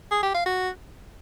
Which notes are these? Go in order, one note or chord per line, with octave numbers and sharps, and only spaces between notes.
G#4
G4
F5
F#4